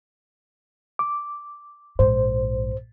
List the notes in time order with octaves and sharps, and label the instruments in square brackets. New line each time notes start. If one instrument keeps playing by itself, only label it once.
[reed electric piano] D6
[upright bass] A#1 G#2 [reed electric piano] C5